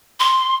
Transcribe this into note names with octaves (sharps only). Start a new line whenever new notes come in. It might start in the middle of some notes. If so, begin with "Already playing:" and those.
C6